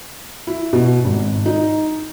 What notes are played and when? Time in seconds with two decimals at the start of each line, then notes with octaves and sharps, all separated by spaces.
0.47 E4
0.73 B2
1.04 G#1
1.46 D#4